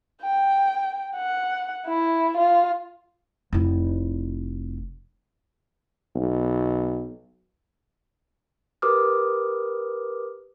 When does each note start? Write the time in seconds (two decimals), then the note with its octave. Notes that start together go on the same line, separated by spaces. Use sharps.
0.22 G5
1.16 F#5
1.86 E4
2.37 F4
3.53 F1 E4
6.15 B1
8.82 G4 A#4 B4 D6 D#6 F6